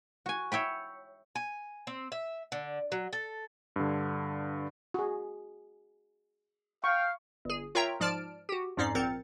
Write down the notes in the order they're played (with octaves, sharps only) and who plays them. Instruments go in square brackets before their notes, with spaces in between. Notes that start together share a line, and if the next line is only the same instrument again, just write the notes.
[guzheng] F#4 G#5
C#5 E5 G5 B5
[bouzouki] G#5
C4
E5
D3
F#3
A4
[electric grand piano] G2 D3
[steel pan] F#4 G#4
[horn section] F5 [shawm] G5 [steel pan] C#6
[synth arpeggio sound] G1 G#4
F4 A#4 C#5 E5 G5 A#5
G#2 F3 D5 A5 F6 D7
F#4 G4
F2 G#2 C#4 D#4 D5 C7
A#1 C4 A#4 A6 C#7